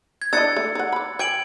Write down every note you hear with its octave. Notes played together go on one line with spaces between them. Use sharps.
G#6
D4 E4 D#5 E6 A6 C#7
A3
D#4 F#5
D5 B5
G5 G#5 G#6 D7 F#7